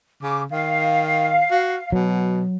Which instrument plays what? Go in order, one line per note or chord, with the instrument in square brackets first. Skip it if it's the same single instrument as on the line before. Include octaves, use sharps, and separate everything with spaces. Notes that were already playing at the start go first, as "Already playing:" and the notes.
[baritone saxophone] C#3 [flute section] D6
[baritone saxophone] D#3 [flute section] F5
[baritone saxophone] F#4
[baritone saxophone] B2 [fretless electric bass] F#3